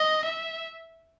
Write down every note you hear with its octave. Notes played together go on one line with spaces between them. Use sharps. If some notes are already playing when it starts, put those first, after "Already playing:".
Already playing: D#5
E5